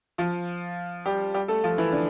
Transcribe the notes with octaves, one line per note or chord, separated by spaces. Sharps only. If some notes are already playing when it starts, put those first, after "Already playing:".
F3 F4
G3 G4
G3 G4
A3 A4
F3 F4
E3 E4
D3 D4